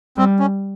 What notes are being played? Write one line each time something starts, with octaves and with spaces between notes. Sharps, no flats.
G3 C4
C#4